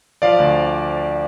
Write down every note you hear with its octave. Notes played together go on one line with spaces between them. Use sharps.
F3 D5 F5
D2